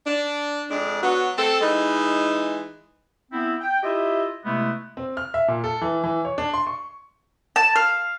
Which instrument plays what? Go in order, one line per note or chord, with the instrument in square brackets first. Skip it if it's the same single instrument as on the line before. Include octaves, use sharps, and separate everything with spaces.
[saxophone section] D4
F2 G#3 D4
F#3 B3 F#4
C4 A4
E3 G#3 D#4
[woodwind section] B3 C4 E4
G5
E4 F4 G4 D#5 E5
C3 G#3 A3 B3 E4
[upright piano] C4
F6
E5
A#2
A4
E3
E3
C#5
D4
C6
C#6
[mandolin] A5
F5